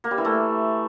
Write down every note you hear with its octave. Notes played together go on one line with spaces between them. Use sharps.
A#3
G3
E3
A3